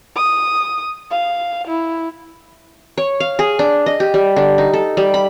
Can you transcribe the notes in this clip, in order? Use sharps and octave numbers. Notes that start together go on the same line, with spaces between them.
D#6
F5
E4
C#5
F5
G#4
D4
D#5
G4
G3
D3
D#4
A4
G3
B5